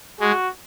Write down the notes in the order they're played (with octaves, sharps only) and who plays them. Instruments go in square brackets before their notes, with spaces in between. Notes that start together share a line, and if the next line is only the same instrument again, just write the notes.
[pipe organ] G#3 [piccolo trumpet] F#4